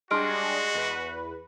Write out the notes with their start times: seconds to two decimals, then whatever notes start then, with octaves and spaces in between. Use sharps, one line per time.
0.11 G3 G#3 D4 F#4 G#4 C6 F6 D7
0.74 E2 B4